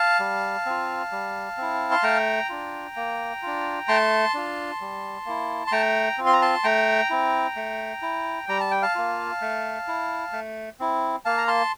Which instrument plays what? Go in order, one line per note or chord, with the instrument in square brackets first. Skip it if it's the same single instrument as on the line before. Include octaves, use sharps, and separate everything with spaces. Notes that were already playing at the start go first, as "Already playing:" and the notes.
Already playing: [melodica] F5 A5
G3
C4 F4
G3
C4 E4
C6
A3 G5 A#5
D4 F4
A#3
D4 F4
A3 A5 C6
D4 F4
G3
A#3 E4
C6
A3 G5 A#5
C4 F4
C6
A#5
A5 C6
A3 G5 A#5
C4 E4
A3
E4
G3 A#5
A5
G5
F5 A5
A#3 F4
A3
E4
A3
C4 E4
A#3 F5 A5
A#5
A5 C6